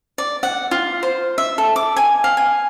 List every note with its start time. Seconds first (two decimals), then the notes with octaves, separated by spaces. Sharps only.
0.18 D5
0.43 F#5
0.71 F4
1.03 C5
1.38 E5
1.58 A4
1.76 D6
1.96 G#5
2.24 F5
2.37 G#5